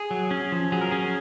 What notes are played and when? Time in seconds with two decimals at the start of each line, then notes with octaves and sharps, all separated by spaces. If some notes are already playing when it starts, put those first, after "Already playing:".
Already playing: G#4
0.11 F#3
0.31 C#4
0.52 F3
0.72 F#3 G#4
0.81 A#4
0.91 C#4 G#4